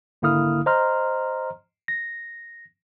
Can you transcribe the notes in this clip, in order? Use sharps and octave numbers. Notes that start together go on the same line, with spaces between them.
G#1 D3 A#3 E4 D#6 F6
C5 D#5 A#5 C6 F6
A#6